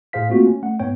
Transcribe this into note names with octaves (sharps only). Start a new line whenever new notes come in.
A2 G#4 C5 F5 B6
A3 A#3 C4 F4 F#4
C#4
A3 F#5
G#2 B3 C#5 G5